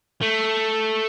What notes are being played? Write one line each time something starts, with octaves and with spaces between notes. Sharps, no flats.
A3